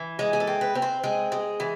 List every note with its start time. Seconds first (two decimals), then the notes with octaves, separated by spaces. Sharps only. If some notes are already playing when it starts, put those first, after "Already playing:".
Already playing: E3
0.19 G#3 G#4
0.33 G#4
0.40 A4
0.47 C4
0.61 B4
0.75 C4
0.82 C5
1.04 G#3 G#4
1.32 G#3
1.60 E3